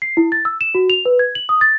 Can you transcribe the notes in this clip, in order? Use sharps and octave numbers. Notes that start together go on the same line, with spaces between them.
C7
E4
A6
E6
E7
F#4
F7
B4
G#6
F#7
D#6
A6